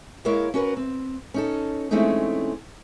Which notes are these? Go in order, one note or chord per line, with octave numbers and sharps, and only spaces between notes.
G#3 A#3 E4 A#4 C#5 F5
C#4 F#4 A#4 B4
C4
C#4 D#4 A4
E3 G#3 A3 C4 C#4 D#4